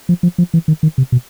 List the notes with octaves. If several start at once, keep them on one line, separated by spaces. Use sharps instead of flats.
F3
F3
F3
E3
D#3
D#3
C3
B2